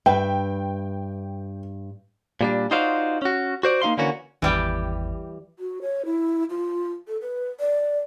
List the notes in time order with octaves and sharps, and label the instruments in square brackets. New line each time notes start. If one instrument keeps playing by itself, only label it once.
[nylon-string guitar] G2 B4 E5 [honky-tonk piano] G5
[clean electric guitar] A#2 G3 D4
D#4 F4 F#4 C5 D5 F5
C#4 F#4
F#4 C5 D5
A#3 D#4 F5 C6
D3 E3 A#3 C#4 F#4
[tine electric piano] G#1 E2 [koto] E3 G3 G4
[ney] F#4
C#5
E4
F4
A4
B4
D5